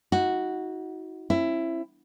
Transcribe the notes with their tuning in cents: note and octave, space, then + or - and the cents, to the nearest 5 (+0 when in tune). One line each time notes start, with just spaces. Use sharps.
D#4 +45 F#4 +0
C#4 -45 E4 +15